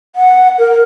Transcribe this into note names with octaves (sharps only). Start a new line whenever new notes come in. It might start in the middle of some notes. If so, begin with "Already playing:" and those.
F#5
A#4